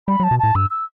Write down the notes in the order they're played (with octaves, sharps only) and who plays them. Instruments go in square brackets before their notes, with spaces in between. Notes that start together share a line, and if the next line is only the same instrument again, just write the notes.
[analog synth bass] G3 [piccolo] B5
[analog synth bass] F#3
[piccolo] A5
[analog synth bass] B2
[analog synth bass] A2 [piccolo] A5
[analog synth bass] G2 [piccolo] E6
[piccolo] E6